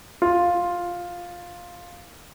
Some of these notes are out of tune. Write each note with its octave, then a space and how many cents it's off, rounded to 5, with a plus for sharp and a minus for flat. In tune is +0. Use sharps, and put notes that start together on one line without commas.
F4 +5